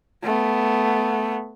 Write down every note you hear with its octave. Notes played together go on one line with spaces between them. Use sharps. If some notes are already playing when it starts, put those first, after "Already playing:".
A3 B3